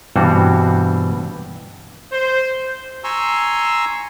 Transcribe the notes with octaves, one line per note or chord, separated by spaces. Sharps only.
G2 B2 E3 G3 C4 F#4
C5
G#5 A#5 C6 C#6 E6